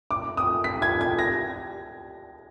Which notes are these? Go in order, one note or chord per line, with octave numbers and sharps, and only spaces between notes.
D6
D#6
B6
G#6
G#6
A#6